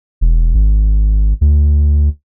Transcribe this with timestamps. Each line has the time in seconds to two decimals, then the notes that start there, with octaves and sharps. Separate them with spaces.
0.21 E1
0.55 G#1
1.41 D2